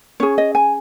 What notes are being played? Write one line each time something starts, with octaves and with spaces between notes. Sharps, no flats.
C#4 G#4 C#5
D#5
G#5